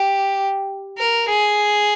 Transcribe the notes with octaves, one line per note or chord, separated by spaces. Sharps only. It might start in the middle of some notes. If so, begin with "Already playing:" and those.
Already playing: G4
A#4
G#4